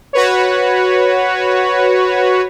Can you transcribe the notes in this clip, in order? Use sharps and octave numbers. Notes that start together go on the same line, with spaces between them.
F#4 B4 C#5